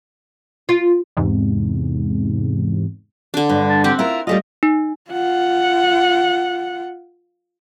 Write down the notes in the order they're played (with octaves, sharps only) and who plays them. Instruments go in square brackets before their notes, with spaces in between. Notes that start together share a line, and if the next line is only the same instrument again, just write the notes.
[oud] F4
[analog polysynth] E2 G#2 C3
[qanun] D3 D4
[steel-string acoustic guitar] G2
[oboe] A5
[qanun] C4 F#5 [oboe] G4
[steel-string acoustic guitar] E4 F4 A#4 [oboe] E5
[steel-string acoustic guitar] G3 A3 F4 [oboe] D#5
[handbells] D#4
[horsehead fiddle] F4 F#5